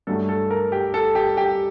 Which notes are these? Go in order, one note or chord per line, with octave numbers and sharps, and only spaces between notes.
G2 F#3 A3 A4
A4
A#4
G4
A4
G4
G4